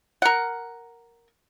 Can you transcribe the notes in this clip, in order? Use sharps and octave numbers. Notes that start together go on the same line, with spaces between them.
A#4 F#5